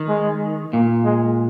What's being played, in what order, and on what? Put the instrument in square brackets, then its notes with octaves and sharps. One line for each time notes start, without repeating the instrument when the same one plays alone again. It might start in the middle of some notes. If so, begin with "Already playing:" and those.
Already playing: [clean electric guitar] D#3
[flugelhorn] G#3
[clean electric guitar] A#2 [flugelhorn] A#3
[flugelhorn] G#3